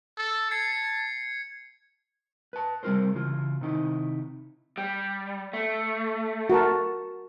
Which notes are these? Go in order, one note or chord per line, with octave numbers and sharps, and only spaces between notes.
A4
A5 G#6 C7 C#7
B4 A5
C3 G3 C4 F4 A#4 C5
C#3 E3 F4
C3 D#3 D#4 E4
G3
A3
F#4 A#4 A5